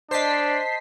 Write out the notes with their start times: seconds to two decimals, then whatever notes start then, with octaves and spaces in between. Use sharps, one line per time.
0.11 D4 C5 D#5 A5 B6 C7